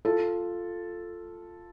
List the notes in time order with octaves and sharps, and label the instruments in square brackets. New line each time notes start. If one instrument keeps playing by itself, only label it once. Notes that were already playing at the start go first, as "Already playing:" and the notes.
[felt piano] F4 A4